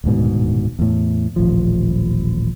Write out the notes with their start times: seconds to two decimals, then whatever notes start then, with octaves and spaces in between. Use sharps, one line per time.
0.04 D#1 D2 G#2 B2
0.79 E2 A2
1.36 D#1 A1 F3